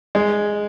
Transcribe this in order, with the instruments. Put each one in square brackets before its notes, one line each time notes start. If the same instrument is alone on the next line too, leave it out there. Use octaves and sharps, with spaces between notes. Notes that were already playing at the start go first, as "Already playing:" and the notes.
[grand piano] G#3